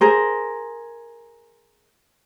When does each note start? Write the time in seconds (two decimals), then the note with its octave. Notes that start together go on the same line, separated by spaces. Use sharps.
0.01 G#4 A#4 C5